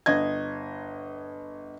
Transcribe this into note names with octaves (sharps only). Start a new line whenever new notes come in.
G1 D#5 G#6